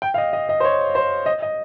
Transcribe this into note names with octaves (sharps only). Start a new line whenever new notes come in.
G5
F5
D#5
D#5
D#5
C5
C#5
C5
D#5
D#5